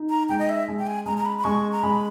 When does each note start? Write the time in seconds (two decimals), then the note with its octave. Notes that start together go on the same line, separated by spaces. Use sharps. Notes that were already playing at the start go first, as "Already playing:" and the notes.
Already playing: D#4
0.10 A#5
0.29 G#3 G5
0.39 D#5
0.49 E5
0.68 G#3
0.79 G5
0.87 G#5
1.06 G#3 A#5
1.17 A#5
1.25 B5
1.39 B5
1.44 G#3 C#6
1.72 A#5
1.83 G#3 B5